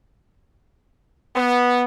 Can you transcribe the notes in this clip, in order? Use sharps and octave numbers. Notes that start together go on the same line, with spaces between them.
B3